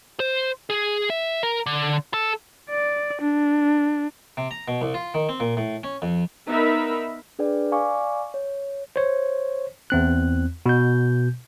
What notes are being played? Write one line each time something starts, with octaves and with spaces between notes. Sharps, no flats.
C5
G#4
E5
A#4
D3
A4
D5
D4
C3
A#5
B2
C2
F4
D#3
C4
A#2
A2
C#4
F2
B3 D#4 A#4 E5 B5
D4 G#4 B4 D5 G5
D5 F5 G#5 C#6 D6
C#5
C5 C#5
E2 C4 F#6
B2 G6